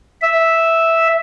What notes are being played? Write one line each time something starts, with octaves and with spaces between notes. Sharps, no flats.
E5